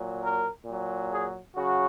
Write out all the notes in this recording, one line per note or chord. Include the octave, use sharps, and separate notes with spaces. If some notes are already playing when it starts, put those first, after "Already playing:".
Already playing: A#2 F#3
A#4
A#2 F#3
G#4
C#3 F#3 F#4